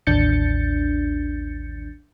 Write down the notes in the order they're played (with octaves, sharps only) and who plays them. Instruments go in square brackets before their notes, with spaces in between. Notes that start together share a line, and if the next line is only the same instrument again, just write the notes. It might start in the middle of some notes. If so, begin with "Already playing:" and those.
[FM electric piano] A1 D#2 D4 G6 A6 C#7